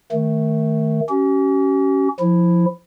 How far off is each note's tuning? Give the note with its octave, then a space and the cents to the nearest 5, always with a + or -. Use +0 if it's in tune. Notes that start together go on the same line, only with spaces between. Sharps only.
D#3 +0 A3 +0
C#4 +0 G4 -45
F3 +0 E4 +0